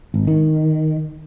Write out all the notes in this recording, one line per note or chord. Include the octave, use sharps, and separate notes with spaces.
G#1
D#3